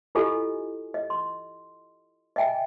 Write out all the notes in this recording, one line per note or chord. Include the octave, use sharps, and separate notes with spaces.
E4 F4 G4 A4 D#5 G#5
D#5
C6
D#5 E5 G5 G#5 A#5